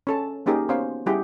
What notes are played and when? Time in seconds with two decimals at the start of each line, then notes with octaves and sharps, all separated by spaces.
0.07 C#4 A4 A5
0.46 A#3 C#4 D#4 G4 G#4 A#4
0.69 B3 C#4 C5 F5
1.06 G3 C#4 E4 G4 G#4 F#5